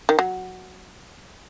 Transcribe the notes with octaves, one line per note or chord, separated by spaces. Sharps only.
D#3
F#3